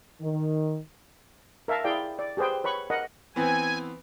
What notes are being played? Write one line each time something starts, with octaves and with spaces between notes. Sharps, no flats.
D#3
A#4 E5 F5 A5
E4 G#4 D5 F5 G5 A5
D5
G4 G#4 B4 C5 G5
B4 C#5 B5 C#6
A#4 D#5 F#5
E3 B3 C4 G#5